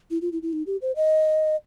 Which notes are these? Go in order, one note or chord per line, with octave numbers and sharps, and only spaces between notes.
E4
F4
E4
E4
D#4
G4
C5
D#5